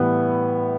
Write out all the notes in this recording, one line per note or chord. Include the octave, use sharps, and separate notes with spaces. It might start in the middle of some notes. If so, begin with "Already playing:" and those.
Already playing: A2 E3 G3 B3